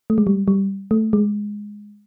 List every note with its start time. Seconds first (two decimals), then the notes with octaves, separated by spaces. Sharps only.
0.10 A3
0.18 G#3
0.27 G3
0.48 G3
0.91 A3
1.13 G#3